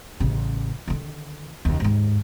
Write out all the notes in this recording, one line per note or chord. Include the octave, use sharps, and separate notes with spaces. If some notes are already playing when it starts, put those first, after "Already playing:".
A1 C#3
D3 D#3
D#2 C#3
D#2 G#2